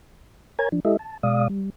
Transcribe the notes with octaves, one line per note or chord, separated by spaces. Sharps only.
A#4 C#5 G#5 A#5 G#6
F3 D4
G#3 E4 G4 A4 D#5 E5
A5
B2 G#3 D5 F5 D#6
G3